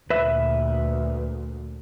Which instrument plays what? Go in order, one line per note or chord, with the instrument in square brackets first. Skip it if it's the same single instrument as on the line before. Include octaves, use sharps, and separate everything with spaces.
[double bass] D2 A#2 [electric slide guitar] B4 E5